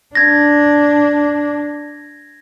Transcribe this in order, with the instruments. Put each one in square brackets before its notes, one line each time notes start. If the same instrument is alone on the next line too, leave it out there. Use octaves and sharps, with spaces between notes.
[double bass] D4 [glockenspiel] G#6 A#6